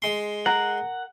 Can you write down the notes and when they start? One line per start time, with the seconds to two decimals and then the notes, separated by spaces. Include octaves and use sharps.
0.02 G#3 C6
0.46 A#4 F#5